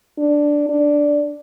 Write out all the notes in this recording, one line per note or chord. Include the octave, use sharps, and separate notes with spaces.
D4
D4